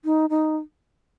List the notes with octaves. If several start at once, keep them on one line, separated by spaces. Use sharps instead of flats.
D#4
D#4